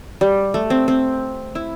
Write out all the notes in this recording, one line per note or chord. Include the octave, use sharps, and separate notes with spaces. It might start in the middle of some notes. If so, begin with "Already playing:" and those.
G3
A3
C4
C4
E4